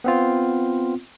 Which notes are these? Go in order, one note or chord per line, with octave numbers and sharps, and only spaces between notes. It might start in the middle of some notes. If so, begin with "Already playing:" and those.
B3 C4 F4